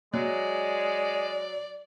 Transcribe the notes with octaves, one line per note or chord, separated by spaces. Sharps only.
F#3 G#3 D5